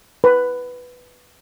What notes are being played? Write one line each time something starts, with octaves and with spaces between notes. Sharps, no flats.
B4